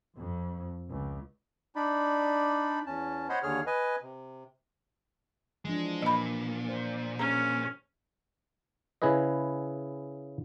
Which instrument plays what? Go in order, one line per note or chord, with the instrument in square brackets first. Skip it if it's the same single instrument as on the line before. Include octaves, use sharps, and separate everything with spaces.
[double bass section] F2
C#2
[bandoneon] D4 D#4 D5 B5
E2 C#4 A5
C5 C#5 D#5 F#5 B5 C6
D#2 D3 G#4 C#5 F6
B4 D#5 G#5
C3
[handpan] E3 F3 D4 [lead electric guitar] G#3
[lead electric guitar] A#2 [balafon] D#5 B5
[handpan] C5
[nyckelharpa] C#4 [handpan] G#4 [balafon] A#5
[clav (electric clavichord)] C#3 E4 G#4 B4 D#5